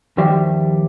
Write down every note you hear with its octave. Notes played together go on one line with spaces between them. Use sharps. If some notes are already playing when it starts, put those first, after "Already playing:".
D#2 F3 G3 D5 E5 G5